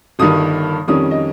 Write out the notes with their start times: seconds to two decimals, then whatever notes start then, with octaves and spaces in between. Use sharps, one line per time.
0.19 G1 G2 D#3 D#6
0.88 F2 D#3 G3 C#4 D#6
1.11 D#5